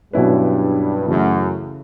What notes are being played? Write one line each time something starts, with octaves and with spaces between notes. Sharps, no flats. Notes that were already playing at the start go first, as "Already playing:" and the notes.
G2 B2 F#3 C#4 E4 B4
F#2 C#3 E3 A3